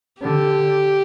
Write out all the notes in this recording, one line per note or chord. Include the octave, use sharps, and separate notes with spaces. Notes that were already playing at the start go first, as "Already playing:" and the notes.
D3 G4